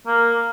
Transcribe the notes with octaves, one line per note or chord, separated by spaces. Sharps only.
A#3